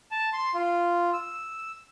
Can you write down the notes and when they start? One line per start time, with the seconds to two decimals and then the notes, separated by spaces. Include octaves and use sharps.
0.11 A5
0.33 C6
0.55 F4
1.14 E6